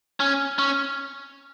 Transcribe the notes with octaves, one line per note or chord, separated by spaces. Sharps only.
C#4
C#4